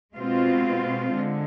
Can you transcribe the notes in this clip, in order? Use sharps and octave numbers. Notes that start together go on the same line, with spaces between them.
B2 G#3 C4 F4
D3 G#3